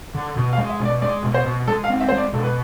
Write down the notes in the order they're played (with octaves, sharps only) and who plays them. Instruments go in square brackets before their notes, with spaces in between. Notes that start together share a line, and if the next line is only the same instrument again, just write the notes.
[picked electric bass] D3
B2
[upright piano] F5
[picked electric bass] G#3
[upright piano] E5
[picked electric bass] B2
[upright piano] D5
[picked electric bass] G#3 [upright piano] D5
[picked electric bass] B2
[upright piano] C5
[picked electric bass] B2
[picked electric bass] G#3 [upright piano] A4
[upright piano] F5
[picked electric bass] C4
[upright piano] E5
C5
[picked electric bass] G#3
[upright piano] D5
[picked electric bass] B2 [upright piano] A4
[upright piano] B4